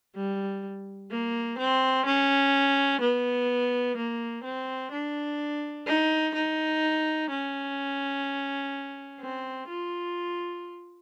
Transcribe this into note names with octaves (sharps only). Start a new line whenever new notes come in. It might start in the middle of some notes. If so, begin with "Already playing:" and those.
G3
A#3
C4
C#4
B3
A#3
C4
D4
D#4
D#4
C#4
C4
F4